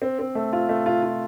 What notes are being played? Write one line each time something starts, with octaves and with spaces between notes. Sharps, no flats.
C4
C4
A3
F4
A3
F4
F4